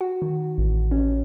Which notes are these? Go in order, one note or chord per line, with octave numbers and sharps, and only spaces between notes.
F#4
D#3
A1
C#4